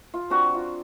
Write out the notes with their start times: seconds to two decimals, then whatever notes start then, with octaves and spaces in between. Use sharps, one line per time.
0.14 F4
0.30 C4 D4 F#4 A#5
0.54 F4